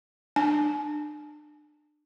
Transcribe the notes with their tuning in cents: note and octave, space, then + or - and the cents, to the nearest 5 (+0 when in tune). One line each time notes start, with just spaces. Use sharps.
D4 +30 G#5 +40